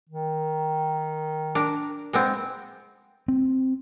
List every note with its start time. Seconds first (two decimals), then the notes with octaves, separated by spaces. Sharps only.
0.10 D#3
1.55 D4 A#4
2.13 G#3 B3 C4
3.28 C4